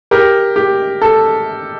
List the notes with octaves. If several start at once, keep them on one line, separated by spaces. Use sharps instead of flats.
G4 A#4
G4
A4